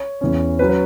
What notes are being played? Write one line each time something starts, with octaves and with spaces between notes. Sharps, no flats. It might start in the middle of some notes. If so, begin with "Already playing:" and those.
Already playing: C#5
E2 E3 C#4
F#3 C#4 B4
B4